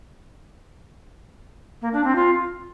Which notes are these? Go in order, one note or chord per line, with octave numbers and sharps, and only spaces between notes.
A#3
D4
C4
F4